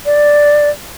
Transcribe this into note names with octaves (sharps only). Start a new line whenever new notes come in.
D5